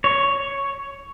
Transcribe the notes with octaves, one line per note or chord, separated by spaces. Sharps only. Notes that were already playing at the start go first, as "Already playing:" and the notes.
C#5